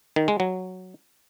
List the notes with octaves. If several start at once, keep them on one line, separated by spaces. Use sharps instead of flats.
D#3
G#3
F#3